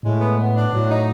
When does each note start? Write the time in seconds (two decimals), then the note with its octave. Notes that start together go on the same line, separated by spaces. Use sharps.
0.03 A2 G#3
0.20 B3
0.38 B3
0.55 D4
0.72 A2 F#3
0.90 D#4